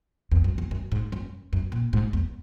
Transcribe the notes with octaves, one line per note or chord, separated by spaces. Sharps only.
E2
F#2
E2
F#2
G#2
F#2
F#2
A#2
G#2
E2